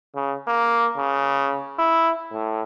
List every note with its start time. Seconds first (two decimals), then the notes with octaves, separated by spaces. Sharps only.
0.15 C#3
0.47 A#3
0.97 C#3
1.79 E4
2.32 A2